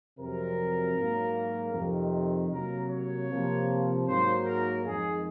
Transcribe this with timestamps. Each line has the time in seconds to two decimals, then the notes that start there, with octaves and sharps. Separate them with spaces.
0.18 F2 C3 F#3 A#4
0.95 G#2 F#3 A#3
1.73 F2 C3 D#3
2.52 C3 F#3 A#3 A#4
2.90 C#5
3.30 C3 F3 A#3
4.07 G#2 F#3 A#3 C5
4.46 A#4
4.85 F2 D#3 G#3 G#4